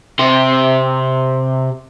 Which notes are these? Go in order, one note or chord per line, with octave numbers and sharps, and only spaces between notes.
C3 C5